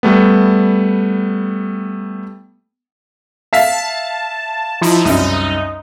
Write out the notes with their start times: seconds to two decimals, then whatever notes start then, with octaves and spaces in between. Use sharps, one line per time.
0.03 G3 A3 B3
3.53 E5 F5 A5 B6
4.81 F3 D#4 E4
5.05 C2 F#2 D#4